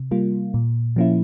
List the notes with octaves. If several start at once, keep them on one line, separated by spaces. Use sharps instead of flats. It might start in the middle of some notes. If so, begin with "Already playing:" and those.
Already playing: C3
G3 A#3 F4
A#2
F3 A#3 C#4 E4